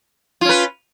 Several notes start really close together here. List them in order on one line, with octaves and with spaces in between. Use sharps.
F4 C#4 B4